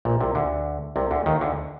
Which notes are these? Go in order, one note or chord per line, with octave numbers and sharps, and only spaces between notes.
A#1 A#2
C2 C3
D2 D3
C2 C3
D2 D3
D#2 D#3
D2 D3